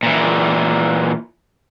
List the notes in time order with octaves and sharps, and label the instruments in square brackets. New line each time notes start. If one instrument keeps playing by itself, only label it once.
[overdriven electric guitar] A#2 E3